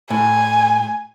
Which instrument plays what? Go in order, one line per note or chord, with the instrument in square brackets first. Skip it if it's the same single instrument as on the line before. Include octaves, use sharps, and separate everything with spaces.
[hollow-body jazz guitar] A2 [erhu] G#5